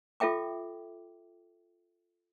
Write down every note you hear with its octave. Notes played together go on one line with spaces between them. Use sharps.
F4 A4 E5 G5 D6